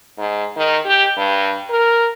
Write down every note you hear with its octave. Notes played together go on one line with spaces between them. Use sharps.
G#2
D#3
G4
G2
A#4